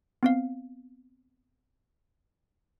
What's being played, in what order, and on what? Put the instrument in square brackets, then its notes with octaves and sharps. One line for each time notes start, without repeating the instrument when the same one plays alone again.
[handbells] B3 C4 F5